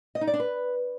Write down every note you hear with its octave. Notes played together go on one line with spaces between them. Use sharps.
D#5
D#4
D5
D4
B4